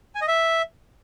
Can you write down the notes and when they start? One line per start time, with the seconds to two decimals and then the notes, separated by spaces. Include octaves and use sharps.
0.15 G#5
0.21 D#5
0.28 E5